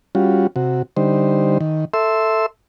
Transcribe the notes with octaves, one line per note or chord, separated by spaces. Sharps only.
G3 C#4 F4 F#4
C3 F#4
D3 G3 D#4 C5
D#3
A4 E5 C6 E6